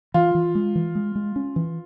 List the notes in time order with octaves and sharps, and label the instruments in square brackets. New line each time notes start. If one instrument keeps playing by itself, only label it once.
[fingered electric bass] E3 [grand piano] F4
[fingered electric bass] E3
G#3
E3
G#3
G#3
C#4
E3